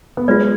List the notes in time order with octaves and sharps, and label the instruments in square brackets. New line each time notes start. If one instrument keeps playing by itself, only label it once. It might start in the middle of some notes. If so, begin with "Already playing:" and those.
[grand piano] B3
[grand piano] G#3 [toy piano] F4 B4 D5